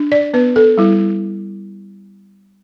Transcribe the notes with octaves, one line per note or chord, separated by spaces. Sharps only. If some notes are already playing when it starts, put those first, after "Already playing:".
Already playing: D4
D5
B3 B4
A4
G3 E4